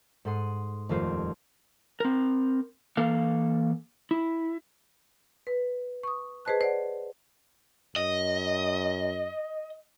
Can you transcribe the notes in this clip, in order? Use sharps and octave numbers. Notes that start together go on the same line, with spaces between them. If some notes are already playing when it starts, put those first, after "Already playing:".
G#2 A4 F#5 C6 D#6
D#1 F2 A3 F4 C5 G6
C4 A#4
E3 A#3 A4 F5
E4
B4
C#6 D#6
G#4 B4 C5 D#5 A5 F#6
C5 D5 F#5
F#2 D#5